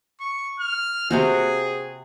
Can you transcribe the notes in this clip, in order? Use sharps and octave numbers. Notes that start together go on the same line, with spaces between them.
C#6
F6
C3 C4 F#4 G#4